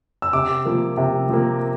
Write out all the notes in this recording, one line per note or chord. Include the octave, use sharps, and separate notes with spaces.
E6
C3 D6
F3 A#3
C3
F3 A#3